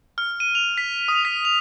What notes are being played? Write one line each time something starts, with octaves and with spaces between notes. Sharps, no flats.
F6
D#7
F7
B6
D#6
B6
F7